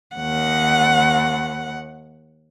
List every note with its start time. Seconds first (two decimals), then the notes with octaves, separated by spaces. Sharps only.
0.16 D#2 F#5